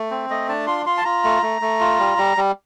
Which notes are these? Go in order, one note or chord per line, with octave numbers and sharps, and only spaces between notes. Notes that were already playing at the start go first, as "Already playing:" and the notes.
Already playing: A3
C4
A3 D#5
D4 A5
F4 C6
F4 C6
A5
F4 A#5
A3
A3
A3
F4
G3
G3
G3